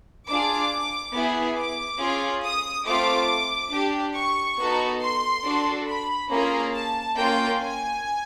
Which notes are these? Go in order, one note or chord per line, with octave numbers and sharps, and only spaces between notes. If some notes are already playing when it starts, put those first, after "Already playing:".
D4 F4 G#4 D6
B3 E4 G#4
D6
C#4 F4 G#4
D#6
A3 C4 F4 D6
D4 G4
C#6
B3 D#4 F#4 A4
C6
D4 F#4 A4
B5
A#3 C#4 F4 G#4 A#5
A5
A#3 C#4 F4 G5
G#5